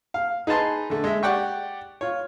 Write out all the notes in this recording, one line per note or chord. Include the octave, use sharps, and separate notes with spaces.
F5
D#4 G#4 B4 A5 C6
D3 A3
G#3 E5
G4 D5 F#5 G5 C#6
F4 C#5